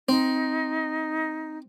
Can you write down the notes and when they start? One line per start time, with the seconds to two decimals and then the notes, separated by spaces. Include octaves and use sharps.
0.09 C4 D#4